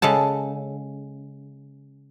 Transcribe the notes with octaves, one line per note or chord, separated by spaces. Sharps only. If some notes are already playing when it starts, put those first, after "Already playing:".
C#3 G#3 A4 A5